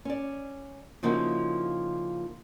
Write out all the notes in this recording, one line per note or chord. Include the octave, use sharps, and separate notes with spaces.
C#4 D5
C#3 F3 A#3 D#4 E4 F#4